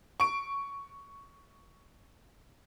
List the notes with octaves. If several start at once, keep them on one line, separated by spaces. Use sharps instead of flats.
C#6 D7